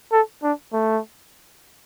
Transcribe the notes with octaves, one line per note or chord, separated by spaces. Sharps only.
A4
D4
A3